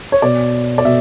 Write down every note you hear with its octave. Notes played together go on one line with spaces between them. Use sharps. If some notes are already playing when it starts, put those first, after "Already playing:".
C#5
B2 D5
D5
B2 E5